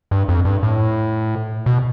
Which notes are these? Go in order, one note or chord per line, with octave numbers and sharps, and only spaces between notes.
G2
F2
G2
A2
B2